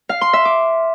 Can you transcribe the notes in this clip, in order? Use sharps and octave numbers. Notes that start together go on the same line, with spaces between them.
F5
C6
E5
D6